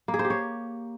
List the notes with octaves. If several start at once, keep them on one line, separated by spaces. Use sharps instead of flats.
A#3
G#4
C5
G4
C#5